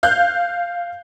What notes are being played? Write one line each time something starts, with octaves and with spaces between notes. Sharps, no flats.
F5 F#6 G6